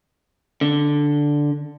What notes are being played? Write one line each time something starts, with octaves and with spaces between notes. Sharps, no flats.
D3